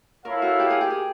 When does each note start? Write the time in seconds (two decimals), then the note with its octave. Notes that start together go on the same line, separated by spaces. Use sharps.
0.25 E4 A4 A#4 C#5 F5
0.42 F#4
0.60 G4
0.70 G#4
0.81 G4
0.90 G#4